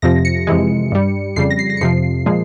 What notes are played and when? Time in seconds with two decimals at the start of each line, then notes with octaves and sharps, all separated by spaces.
0.02 F2 C3 F3 A#6
0.25 C#7
0.47 F2 C3 E3 G#3
0.92 G2 G3
1.36 F2 C#3 G3 C7
1.50 A#6
1.59 C7
1.70 A#6
1.77 C#7
1.81 F2 C3 F3 C7
2.26 A#2 F3 G#3